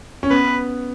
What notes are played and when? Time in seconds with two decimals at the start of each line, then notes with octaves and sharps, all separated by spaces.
0.23 C#4
0.30 B3 B4